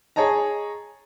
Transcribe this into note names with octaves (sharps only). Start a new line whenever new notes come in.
G#4 C#5 D#5 A5 A#5